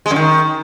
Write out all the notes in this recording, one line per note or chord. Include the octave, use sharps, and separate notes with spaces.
G#3
F#2
D#3